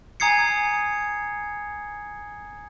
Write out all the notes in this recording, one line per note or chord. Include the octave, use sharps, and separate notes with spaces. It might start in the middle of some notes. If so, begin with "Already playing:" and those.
G#5 A#5 D#6 G#6 C7 C#7